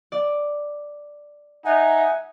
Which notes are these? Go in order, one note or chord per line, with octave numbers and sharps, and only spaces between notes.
D5
D#4 E5 F#5 G#5